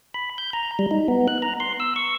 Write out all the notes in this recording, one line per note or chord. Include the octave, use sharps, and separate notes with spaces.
B5
G6
A#5
G3
D#4
B3
F#6
A#5
C6
E6
C#6